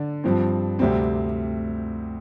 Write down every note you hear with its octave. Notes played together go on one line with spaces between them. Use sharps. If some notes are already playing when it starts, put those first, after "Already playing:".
Already playing: D3 D5
G2 F3 C4
D2 C3 G3 C4